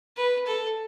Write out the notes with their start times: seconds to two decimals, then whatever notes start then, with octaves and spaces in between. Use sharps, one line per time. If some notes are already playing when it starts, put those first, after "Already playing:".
0.17 B4
0.46 A4